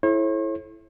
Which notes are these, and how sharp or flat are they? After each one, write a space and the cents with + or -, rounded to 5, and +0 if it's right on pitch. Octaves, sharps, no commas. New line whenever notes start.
E4 +0 A4 -25 C#5 -45